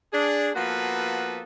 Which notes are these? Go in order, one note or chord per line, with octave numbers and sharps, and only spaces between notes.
D4 G#4
F3 A#3 B3 F#4 A4 B4